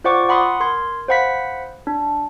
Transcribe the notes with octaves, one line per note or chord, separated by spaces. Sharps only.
F4 C5 D5 F#5 C#6 D6
F#5 B5 C6 D#6
A#4 C6 G#6
C5 F5 F#5 B5 B6
D4